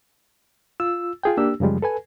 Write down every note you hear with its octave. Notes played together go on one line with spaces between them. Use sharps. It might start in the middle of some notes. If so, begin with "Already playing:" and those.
F4 E6
F4 G#4 G5
A#3 D4 G4 E6
F#2 C#3 F3 G3 G#3
A4 B4 G#5